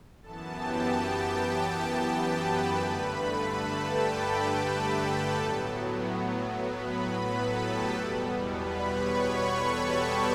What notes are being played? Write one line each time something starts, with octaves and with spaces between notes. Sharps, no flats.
F#2 E3 B3 A4 A5
G4 G5
G4 G5
B4 B5
B4 B5
G2 D3 A3 B4 B5
A4 A5
G4 G5
A2 F#3 B3 A4 A5
B4 B5
B4 B5
A4 A5
G4 G5
E2 B2 G3 B3
B4 B5
C#5 C#6
B4 B5
A4 A5
G4 G5